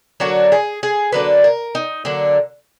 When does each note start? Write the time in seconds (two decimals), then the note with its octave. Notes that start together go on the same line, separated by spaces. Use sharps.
0.20 D3 F#3 A#3 D4 F#4
0.52 G#4
0.83 G#4
1.12 D3 F#3 A#3 D4 B4
1.44 A#4
1.75 D#4
2.05 D3 F#3 A#3 D4